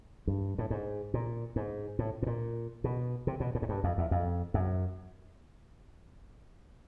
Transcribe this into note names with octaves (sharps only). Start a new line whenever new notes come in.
G2
A2
G#2
A#2
G#2
A2
A2
A#2
B2
C3
B2
A2
G#2
G2
F2
E2
F2
F#2